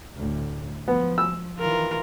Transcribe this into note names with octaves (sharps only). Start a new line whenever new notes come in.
D2 A2
F3 B3
E6
D#3 E3 F4 A#4